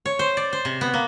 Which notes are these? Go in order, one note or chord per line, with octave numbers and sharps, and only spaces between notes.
C#5
C5
D5
C5
C3
B3
A#3